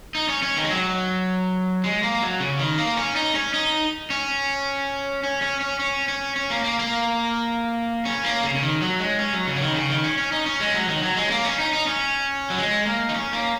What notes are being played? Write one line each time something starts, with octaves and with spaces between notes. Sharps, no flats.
D#4
C#4
C#4
D#3
G#3
F#3
G#3
A#3
F#3
C#3
D#3
A#3
C#4
D#4
C#4
D#4
C#4
C#4
C#4
C#4
C#4
C#4
C#4
A#3
A#3
A#3
C#4
A#3
C#3
C#3
D#3
F#3
G#3
C#4
F#3
C#3
F#3
D#3
C#3
D#3
C#4
C#4
D#4
C#4
G#3
F#3
D#3
F#3
G#3
A#3
C#4
D#4
D#4
C#4
F#3
G#3
A#3
D#4
C#4
A#3